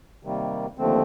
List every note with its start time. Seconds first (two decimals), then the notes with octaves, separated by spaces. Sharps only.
0.23 C3 D#3 G3 A#3
0.77 D#2 D3 F3 A3 C4